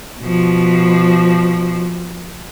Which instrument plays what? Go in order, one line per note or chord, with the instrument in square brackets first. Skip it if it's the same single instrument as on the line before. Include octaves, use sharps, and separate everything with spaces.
[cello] B2 F3